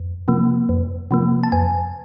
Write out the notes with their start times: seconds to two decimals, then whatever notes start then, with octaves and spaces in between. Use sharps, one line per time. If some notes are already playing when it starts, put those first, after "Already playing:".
Already playing: F2
0.28 C3 F3 A#3
0.69 F2
1.11 C3 F3 A#3
1.43 A5
1.52 F2 G#5